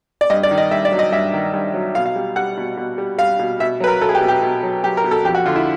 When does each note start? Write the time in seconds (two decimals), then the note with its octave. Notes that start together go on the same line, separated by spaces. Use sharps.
0.21 D5
0.30 G2 D#5
0.43 D5
0.51 D#3
0.58 D#5
0.71 G2 E5
0.85 D5
0.92 F#3
0.99 D#5
1.12 G2 E5
1.33 D#3
1.54 G2
1.74 F#3
1.95 B2 F5
2.06 F5
2.16 G3
2.36 G3 F#5
2.57 B2
2.77 B2
2.98 G3
3.18 G3 F5
3.39 B2
3.60 B2 E5
3.80 F#3 B4
3.88 A#4
4.01 F#3 A4
4.09 G#4
4.15 G4
4.21 B2
4.28 G4
4.42 B2
4.63 F#3
4.84 F#3 G4
4.97 A#4
5.04 B2
5.11 A4
5.25 F2 G4
5.35 F#4
5.46 D3 F4
5.56 E4